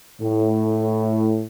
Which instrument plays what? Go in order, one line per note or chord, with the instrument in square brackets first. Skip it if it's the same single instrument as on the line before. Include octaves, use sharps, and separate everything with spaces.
[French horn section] A2